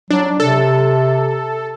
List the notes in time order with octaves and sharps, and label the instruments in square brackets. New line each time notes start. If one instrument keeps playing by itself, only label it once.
[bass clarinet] F#3 [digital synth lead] D4
[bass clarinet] C3 [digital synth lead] A4